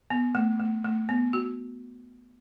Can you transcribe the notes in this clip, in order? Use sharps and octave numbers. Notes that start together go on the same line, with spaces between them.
B3
A3
A3
A3
B3
F#4